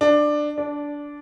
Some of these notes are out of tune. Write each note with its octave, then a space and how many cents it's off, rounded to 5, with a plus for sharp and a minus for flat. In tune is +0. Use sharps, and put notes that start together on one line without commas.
D4 +15
D4 -10